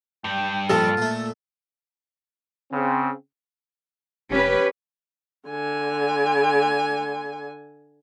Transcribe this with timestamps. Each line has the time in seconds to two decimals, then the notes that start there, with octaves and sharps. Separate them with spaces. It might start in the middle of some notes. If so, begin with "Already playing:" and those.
0.24 G2 G5
0.70 A#2 F3 F4 A4 D#5 A5
0.97 A#2 A3
2.71 C#3 C4
4.30 F1 C#4 G4 B4
5.49 D3 G#5